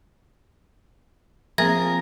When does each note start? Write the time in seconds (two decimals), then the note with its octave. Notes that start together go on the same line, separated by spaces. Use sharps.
1.58 F3 A#3 C4 G#4 A#4 E5 G#6 A#6